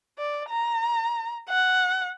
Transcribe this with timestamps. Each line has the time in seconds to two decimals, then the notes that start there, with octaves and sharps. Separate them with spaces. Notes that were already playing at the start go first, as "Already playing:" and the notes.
0.18 D5
0.49 A#5
1.49 F#5